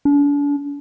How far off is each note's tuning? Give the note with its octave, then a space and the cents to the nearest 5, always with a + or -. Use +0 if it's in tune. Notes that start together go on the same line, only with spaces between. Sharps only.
D4 -40